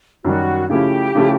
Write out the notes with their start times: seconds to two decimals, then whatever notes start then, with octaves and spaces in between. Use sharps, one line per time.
0.25 F#2 D#3 G3 F#4
0.69 C#3 F3 A3 C#4 E4 G4
1.15 C#3 F3 A3 C#4 E4